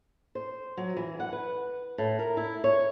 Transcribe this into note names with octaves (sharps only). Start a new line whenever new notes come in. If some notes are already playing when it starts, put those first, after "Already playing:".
C5
F#3
E3
F#5
B4
A2
A#4
E4
C#5